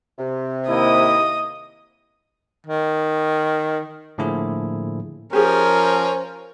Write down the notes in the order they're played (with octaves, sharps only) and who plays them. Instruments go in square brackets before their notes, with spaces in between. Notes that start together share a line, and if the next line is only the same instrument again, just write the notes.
[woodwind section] C3
[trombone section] D#2 A#3 E4 [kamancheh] D#5 D#6
[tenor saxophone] D#3
[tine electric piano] A2 D3 F3 A#3 E4 G#4
[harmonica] F3 C#4 [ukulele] G4 G#4 [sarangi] A#4 [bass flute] C5